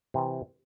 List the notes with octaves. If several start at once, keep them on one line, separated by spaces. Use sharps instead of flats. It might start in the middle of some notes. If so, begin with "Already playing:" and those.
C3 E3